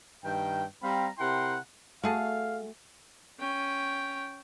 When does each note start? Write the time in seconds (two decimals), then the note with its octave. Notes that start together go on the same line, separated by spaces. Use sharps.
0.24 G2 D#3 A#4 G5
0.83 G3 C4 F5 A#5 B5
1.18 C3 E4 A#4 F#5 G5 C6
2.03 A3 F#4 G#4 F5 A5
3.40 C#4 G5